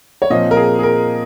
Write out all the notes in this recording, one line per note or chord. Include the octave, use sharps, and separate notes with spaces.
C#5
A#2 F3 C4 D#5
A#4
G#4
G#4
A#4